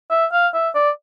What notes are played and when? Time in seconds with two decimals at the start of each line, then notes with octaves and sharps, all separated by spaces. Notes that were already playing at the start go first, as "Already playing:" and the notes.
0.11 E5
0.32 F5
0.54 E5
0.75 D5